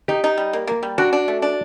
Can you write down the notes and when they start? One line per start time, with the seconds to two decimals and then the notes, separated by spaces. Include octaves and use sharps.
0.08 D#4 G4
0.24 D#4
0.37 G3
0.53 A#3
0.67 A#3
0.83 G3
0.98 D4 F#4
1.13 D4
1.28 A3
1.42 D4